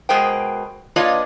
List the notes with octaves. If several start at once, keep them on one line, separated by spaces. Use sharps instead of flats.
B2 G#3 G#4 A#4 C5 G5
A#3 D4 F4 B4 C#5 D#5